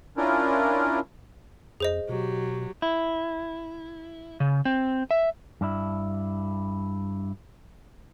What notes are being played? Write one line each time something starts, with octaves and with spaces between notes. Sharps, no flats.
C#4 D4 E4 F4 A#4
F2 G#4 C5 D#5
B2 F#3 G4
E4
C#3
C4
E5
G2 D4 E4